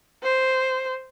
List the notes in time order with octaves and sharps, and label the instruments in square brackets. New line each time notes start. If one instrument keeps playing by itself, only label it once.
[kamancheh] C5